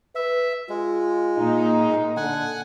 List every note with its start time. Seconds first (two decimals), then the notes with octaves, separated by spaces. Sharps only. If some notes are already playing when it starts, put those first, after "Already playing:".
0.15 B4 E5
0.69 G#3 F4
1.37 A#2 D#4
2.17 D3 F#5 G#5